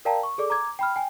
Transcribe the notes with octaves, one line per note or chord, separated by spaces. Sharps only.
A#4 D5 F5 G5 A5 A#5
C#6
G#4 A4 D5 D6
A#5 D6 G#6
G5 B5 F6
G5 G#5